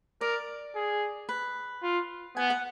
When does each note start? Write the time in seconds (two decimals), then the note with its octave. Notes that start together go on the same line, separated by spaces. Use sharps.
0.21 A#4 D5
0.75 G#4
1.29 B4
1.83 F4
2.37 B3 G#5
2.50 F#5